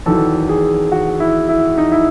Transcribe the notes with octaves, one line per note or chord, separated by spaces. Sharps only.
E2 D#3 F#3 A4
G#4
F#4
E4
E4
D#4
E4